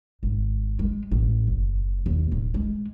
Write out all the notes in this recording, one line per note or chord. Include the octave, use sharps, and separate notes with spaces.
G#1
G#3
A1
F#1
D#2
D1
G#3